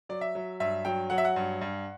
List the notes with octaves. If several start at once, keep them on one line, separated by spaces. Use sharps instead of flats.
F#3 D5
E5
F#3
G2 E5
F#3 G5
F#3 F#5
E5
F#5
G2
G2